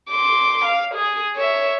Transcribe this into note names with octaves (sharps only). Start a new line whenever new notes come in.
C6 D6
F5
G#4
C#5 E5